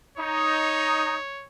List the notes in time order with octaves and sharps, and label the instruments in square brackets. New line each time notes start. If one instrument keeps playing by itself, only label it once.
[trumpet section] D#4 [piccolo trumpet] C#5